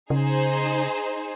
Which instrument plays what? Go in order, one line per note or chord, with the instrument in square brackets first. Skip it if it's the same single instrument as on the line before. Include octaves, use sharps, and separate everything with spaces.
[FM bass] C#3 [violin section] D#4 G#4 C5